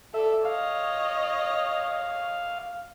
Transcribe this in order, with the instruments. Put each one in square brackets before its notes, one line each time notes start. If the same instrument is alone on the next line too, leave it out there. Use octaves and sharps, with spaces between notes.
[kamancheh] A4 D5 [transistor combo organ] E5
[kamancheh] C#5 D#5 [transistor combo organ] F5